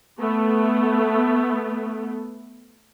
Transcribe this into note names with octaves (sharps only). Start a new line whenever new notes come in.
A3 B3